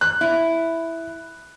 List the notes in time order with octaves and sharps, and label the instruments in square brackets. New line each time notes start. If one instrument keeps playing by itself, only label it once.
[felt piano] F#6
[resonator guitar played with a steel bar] E4